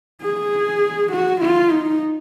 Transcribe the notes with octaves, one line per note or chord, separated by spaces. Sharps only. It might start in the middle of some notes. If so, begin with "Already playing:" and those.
G#4
F#4
F4
D#4